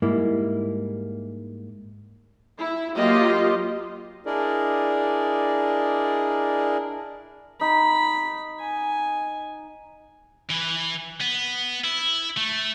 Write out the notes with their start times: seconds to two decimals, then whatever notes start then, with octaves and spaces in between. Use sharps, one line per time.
0.02 G#2 G3 A#3 E4
2.58 E4
2.96 F#3 A#3 F4 G4 D#5
4.26 D4 E4 G#4 A#4 D5 D#5
7.61 D#4 B5
8.60 G#5
10.50 E3 B4
11.21 B3
11.84 E4
12.37 A3